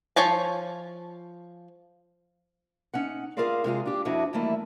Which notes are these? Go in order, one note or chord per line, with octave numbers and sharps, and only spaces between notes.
F3 C#5 G#5 A5
C#4 D#4 F#5
F4 G#4 A#4 C5 D5 F5
C3 G#3 F4 G#4
D4 G4
F2 D4 E4 F#4 D#5
D#3 E3 G3 A3 A#3 E4